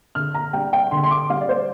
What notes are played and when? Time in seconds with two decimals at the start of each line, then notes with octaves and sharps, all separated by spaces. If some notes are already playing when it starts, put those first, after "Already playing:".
0.15 D3 F6
0.34 A#5
0.53 G3 D4 G5
0.73 G5
0.91 D3 C6
1.04 C6
1.11 D6
1.30 G3 D4 F5
1.41 D5
1.49 C5